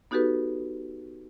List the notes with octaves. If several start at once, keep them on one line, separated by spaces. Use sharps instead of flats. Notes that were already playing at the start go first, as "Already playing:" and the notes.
B3 D#4 F#4 G4 A4 B4